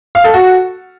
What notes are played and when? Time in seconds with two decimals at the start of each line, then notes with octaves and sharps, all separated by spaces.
0.15 F5
0.24 A4
0.34 F#4